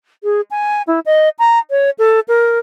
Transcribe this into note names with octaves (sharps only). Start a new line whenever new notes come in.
G#4
G#5
E4
D#5
A#5
C#5
A4
A#4